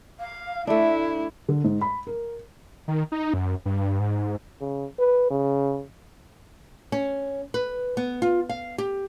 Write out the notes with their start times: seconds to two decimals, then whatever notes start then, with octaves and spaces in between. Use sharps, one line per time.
0.20 F5
0.67 A3 D4 E4 E5
1.48 D3
1.64 G#2
1.81 B5
2.07 A#4
2.88 D#3
3.12 D#4
3.34 F#2
3.65 G2
4.00 G#2
4.61 C#3
4.99 B4
5.30 C#3
6.92 C#4
7.54 B4
7.97 B3
8.22 F4
8.49 F5
8.78 G4